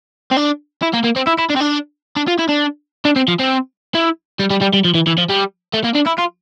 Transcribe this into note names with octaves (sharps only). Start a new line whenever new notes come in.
C4
D4
E4
A#3
A#3
C4
E4
E4
D4
C4
D4
D4
F4
E4
D4
D4
C4
F3
C4
E4
G3
G3
G3
G3
F3
E3
E3
F3
G3
A3
A#3
D4
E4
F4